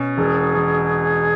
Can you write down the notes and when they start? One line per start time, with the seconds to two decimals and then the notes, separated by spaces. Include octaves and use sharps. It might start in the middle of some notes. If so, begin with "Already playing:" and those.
Already playing: B2 C#4
0.18 E1 G#4
0.54 E1